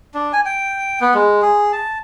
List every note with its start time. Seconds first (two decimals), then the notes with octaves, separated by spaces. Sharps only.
0.14 D4
0.33 G#5
0.45 G5
1.01 B3
1.14 G#3
1.42 G#4
1.72 A5